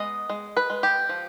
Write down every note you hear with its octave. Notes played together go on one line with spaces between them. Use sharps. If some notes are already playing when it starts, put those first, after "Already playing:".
Already playing: G#3 B3 D#5
G#3
B4
G#3
G4
F3